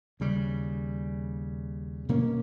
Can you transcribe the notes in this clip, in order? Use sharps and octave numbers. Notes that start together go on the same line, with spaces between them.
D#2 C#3 G3
B2 A#3 C#4